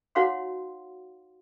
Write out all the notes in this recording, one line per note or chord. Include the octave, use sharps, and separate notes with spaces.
D#4 F#4 C#5 F5 F#5 C6